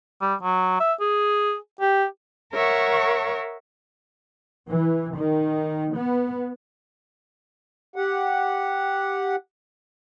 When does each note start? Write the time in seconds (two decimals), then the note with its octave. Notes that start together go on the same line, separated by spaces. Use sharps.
0.21 G3
0.43 F#3
0.80 E5
1.00 G#4
1.80 G4
2.53 A#4 C#5 E5 F#5 C#6
4.70 E3
5.15 D#3
5.96 B3
7.96 G4 F#5